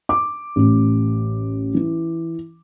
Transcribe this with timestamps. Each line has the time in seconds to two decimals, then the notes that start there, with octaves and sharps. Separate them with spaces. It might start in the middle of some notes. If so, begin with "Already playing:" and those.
0.09 D6
0.56 A1
1.74 E3